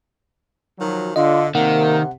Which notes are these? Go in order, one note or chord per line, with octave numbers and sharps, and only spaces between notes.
D#3 F3 F#3
D3 F4 D#5
C3 D#3 A#3 F#5